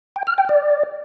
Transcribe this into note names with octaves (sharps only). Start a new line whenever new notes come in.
G5
F6
G5
D5